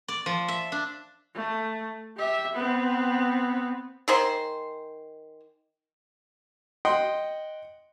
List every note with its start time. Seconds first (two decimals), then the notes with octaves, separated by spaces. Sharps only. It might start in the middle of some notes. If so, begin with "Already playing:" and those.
0.08 D5
0.26 F3
0.48 E5
0.72 D4
1.35 A3
2.17 G4 E5
2.53 B3 C4
4.08 D#3 G#4 C5
6.85 D#5 F#5 G5 C6